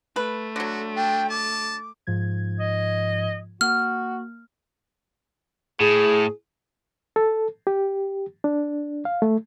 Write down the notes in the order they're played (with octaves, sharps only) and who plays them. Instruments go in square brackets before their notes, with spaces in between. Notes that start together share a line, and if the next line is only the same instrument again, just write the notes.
[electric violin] A3 [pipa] B4
[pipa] D3 F#3 [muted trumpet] F#4
[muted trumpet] D4 [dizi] G5
[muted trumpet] A5 [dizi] D6
[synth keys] G#2 F3 G#6
[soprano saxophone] D#5
[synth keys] A#3 [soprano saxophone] F#4 [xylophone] F6
[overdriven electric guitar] A2 [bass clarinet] G#4
[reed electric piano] A4
G4
D4
F5
A3